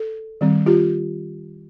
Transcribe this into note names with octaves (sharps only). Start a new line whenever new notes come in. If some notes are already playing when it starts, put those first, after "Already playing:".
Already playing: A4
D#3 G3 C4
F4 G4